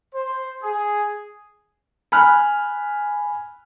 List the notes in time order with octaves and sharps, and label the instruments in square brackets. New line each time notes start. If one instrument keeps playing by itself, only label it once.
[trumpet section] C5
G#4
[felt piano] G#5 B5 F6 F#6